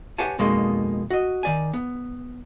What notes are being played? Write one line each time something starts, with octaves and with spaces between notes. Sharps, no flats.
G4 B4 C#5 F#5 G#5 A5
F2 B2 G#3 A#3 D#4
F#4 D#5
D#3 D5 G#5
B3